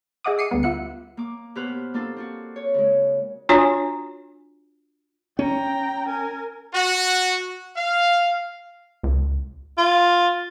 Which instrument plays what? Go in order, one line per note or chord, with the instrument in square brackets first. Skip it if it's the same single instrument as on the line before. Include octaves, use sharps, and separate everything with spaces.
[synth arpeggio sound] G#4 D#5 E5 F#5 D6 D#6
D6 C7 C#7 D#7
D2 G3 B3
F4 E5 F#5 C#7
[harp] A#3 D6
B2 G4 B4 C5 F6 F#6
A#3 D4 F4 A4
C4 F4 F#4
C#5
C#3 G#3
[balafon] D4 F4 F#4 C#5 G#5
[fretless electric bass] C#4 [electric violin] G5 A#5
[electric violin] A#4 G#5
[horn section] F#4
F5
[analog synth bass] C#2
[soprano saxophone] F4